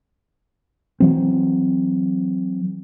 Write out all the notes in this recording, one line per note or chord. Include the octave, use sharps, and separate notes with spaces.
E3 F#3 C4